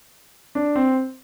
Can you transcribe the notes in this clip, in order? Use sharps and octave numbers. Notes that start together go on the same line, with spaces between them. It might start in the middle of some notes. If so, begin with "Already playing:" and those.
D4
C4